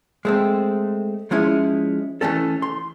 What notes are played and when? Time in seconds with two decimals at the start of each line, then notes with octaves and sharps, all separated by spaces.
0.25 G#3 A3 C4
1.31 F3 G#3 C#4 E4
2.21 E3 A3 C#4 A4
2.62 C6